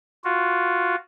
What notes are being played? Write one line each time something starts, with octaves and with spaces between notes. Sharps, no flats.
F4 F#4